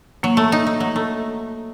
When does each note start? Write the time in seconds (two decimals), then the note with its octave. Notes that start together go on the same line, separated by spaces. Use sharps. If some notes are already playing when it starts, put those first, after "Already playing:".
0.23 F#3 A#3
0.37 A3
0.52 D#4
0.67 D#4
0.80 F#3
0.96 A3